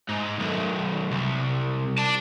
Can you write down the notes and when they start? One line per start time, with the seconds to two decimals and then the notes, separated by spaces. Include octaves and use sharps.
0.09 G#2
0.40 B1 F#2
1.12 C2
1.99 D5 A5